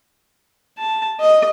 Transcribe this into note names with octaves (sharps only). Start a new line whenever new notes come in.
A5
D#5